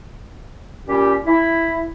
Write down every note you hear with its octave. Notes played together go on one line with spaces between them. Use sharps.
A#2 G3 C#4 G4
E4